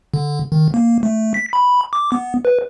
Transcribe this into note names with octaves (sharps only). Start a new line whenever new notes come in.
D3
D#3
A#3
A3
B6
B5
D6
B3
B4